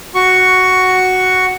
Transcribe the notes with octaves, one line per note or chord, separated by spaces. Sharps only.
F#4 C#6